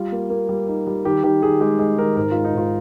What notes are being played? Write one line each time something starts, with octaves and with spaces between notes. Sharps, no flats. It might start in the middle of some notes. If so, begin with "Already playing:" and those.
Already playing: G3 F4
A#3
A#3
G3
D#4
G3
D#3 G4
D#3 G4
D#3 G#4
G#3 G4
G#3 G#4
D#3 A#4
G#2 A#4
G#3 F4
D#4
G#2 F4